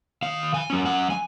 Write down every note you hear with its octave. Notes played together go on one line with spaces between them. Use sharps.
D#3 F5
G#5
F#3 C#4
F#5
G#5